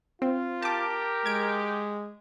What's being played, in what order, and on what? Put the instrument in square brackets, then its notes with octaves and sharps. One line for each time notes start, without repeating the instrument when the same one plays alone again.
[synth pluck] C4 [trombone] F4
[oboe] G4 [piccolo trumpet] A#4 [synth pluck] A5 D6
[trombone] G#3 [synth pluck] G#6 D7